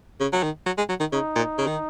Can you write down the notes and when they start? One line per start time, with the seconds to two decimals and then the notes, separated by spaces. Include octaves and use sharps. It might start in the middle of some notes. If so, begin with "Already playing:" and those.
0.20 C#3
0.32 F#3
0.43 D#3
0.66 F#3
0.78 G#3
0.89 F#3
1.00 D#3
1.12 C#3 D#4
1.35 A#2
1.58 C#3
1.67 D#3